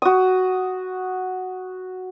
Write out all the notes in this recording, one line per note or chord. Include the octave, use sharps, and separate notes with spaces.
F#4 D#6